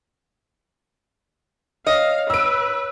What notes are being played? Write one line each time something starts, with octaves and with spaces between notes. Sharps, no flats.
C#5 D#5 F5
B4 E6 D7